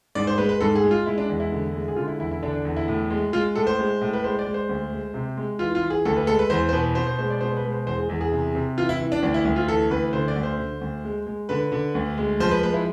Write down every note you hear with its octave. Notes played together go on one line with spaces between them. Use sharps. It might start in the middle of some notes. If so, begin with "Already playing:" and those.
G#2 D5
C5
G#3 B4
B4
G#2 A4
G#4
G#3
F4
G#3 E4
D4
E2
E4
D3
G#3
G#4
D3 F4
E4
E2 E4
E4
D3 D4
D4
E2
E4
A2
G#3
G#3 F4
A2 A4
C5
G#3
A2
B4
G#3 C5
D5
G#3
C5
D2
G#3
C3
G#3
E3 F4
F4
E3
G#4
D2 A4
B4
G#3 A4
B4
E2 C5
C5
B2 B4
B2 C5
C5
G#3 C5
D5
B2 C5
B4
G#3
C5
E2 C5
G#4
E2 G#4
G#4
C3
C3
E3 F4
E4
E3
D4
D2 D4
E4
D2
F4
E3 A4
D2 B4
D3 C5
D5
D2
C5
D3
D2
G#3
G#3
D3 B4
D3
D2
G#3
F3 C5
B4
G#3 B4
E4